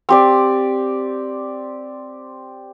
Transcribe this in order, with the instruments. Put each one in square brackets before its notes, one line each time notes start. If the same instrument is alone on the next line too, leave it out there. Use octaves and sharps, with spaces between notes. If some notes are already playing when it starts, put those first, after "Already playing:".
[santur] C4 G4 D5